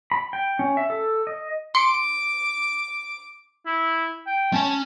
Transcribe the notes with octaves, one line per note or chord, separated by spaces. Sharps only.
B5
G5
C#4
E5
A4
D#5
C6 D6 C#7
E4
G5
C#4 G#5 A5